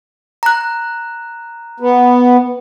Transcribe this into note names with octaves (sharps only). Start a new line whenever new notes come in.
A#5 F#6
B3